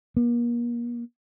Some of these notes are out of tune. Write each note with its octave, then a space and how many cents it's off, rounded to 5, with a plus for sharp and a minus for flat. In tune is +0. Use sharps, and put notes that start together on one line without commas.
A#3 +35